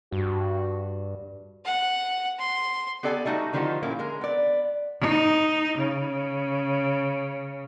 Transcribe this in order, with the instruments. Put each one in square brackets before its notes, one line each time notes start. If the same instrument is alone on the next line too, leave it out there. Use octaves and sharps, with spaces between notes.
[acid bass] G2 [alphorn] F#4
[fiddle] F#5
C6
[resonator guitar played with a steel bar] B3 G4 A4 D5 G5 G#5
G3 A3 D#4 F#4
D3 D#3 F3 G3 D#4 F#4
A#2 A#3 C#4 E4
D3 G#3 A#4
B3 D5
[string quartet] D#4
C#3